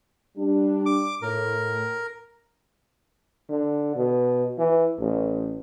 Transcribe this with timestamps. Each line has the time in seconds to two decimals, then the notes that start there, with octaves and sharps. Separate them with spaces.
0.37 G3 D4
0.86 D6
1.22 A2 A#4
3.50 D3
3.96 B2
4.58 E3
4.99 A1